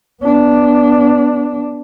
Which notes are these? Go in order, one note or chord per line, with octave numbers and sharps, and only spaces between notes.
B3 D4